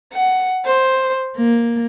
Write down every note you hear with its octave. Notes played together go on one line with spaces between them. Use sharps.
F#5
C5
A#3